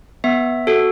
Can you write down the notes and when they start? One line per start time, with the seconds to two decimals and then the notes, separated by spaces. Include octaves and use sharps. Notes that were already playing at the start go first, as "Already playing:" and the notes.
0.24 B3 E5
0.67 F#4 A4